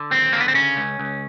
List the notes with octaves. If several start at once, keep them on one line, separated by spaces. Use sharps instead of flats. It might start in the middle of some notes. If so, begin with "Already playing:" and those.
Already playing: D3
D#2 C4
D3 A#3
B3
C4
C#3 C#4
C#2
C#2